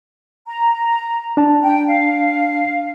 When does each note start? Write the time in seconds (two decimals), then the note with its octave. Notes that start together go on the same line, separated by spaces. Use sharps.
0.47 A#5
1.37 D4 A5
1.63 G5
1.87 F5